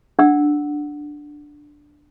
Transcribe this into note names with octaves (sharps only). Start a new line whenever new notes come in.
D4 F#5 E6